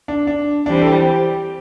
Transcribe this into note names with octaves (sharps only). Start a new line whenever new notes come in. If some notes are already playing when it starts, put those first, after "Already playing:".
D4
D4
E3 G3 C4 D4
A4
G4